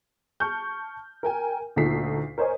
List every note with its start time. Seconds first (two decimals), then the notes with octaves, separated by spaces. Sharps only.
0.40 A5 C#6 F6 G6
1.23 A#4 G5 G#5
1.76 D2 A#2 D#4 A4 B6 C7
2.38 A#4 C5 C#5 D#5 G#5